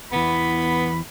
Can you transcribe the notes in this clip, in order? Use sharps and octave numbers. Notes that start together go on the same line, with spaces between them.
E2 E3 B3 B5